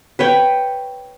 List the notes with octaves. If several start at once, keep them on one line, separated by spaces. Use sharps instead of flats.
B4 C#5 G5